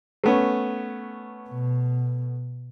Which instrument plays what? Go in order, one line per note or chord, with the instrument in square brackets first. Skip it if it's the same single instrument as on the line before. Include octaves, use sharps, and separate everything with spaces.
[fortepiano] A3 B3 C#4
[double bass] B2